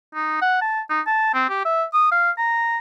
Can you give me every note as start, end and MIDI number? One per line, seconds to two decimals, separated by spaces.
0.14 0.39 63
0.41 0.59 78
0.61 0.81 81
0.90 1.00 63
1.07 1.33 81
1.34 1.45 60
1.49 1.64 67
1.65 1.84 76
1.93 2.09 87
2.12 2.31 77
2.38 2.78 82